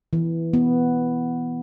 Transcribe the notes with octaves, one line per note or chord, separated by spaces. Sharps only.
E3
B3